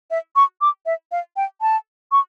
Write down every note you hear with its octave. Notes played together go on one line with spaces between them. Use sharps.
E5
C#6
D6
E5
F5
G5
A5
C#6